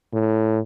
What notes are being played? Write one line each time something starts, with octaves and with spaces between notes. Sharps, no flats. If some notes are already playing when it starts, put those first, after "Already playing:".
A2